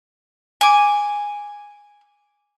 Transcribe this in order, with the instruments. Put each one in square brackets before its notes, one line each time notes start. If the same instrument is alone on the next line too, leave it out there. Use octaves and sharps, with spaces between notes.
[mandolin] G#5 D6